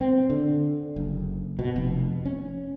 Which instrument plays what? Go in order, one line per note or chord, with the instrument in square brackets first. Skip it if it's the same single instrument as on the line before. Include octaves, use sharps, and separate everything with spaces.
[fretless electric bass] C4
D3
F#1
B2
F1
C#4